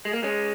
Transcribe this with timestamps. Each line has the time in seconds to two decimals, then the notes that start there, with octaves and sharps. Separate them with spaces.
0.05 G#3
0.13 A#3
0.23 G#3 C#4